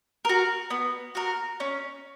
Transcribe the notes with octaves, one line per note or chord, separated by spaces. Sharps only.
F#4 A#4
B3
F#4 A#4
C#4